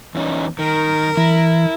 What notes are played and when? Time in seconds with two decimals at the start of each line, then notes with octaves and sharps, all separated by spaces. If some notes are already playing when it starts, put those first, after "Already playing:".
0.15 E2 C#4 D#4
0.59 D#3 A#4
1.17 E3 E4